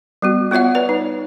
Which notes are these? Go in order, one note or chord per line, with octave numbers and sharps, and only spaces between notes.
G3 B3 F#4
B3 F4 C#5 E5 F#5
B4 C#5 D5
D#4